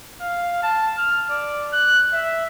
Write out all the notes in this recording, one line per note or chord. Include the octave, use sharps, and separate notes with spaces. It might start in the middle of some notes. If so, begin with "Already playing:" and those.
F5
A5
F6
D5
F#6
E5